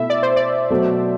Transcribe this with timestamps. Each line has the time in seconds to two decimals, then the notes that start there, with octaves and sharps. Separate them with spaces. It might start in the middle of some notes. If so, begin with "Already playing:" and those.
Already playing: B2 A3 E4 E5
0.10 D5
0.23 C5
0.36 D5
0.70 B2 F#3 A3